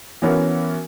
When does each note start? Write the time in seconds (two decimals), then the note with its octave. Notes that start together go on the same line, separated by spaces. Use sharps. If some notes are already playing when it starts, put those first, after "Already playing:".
0.22 E3 B3 C#4 F#4 A#4